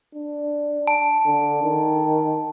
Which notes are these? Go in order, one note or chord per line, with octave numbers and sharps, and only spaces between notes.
D4
A5
D3
D#3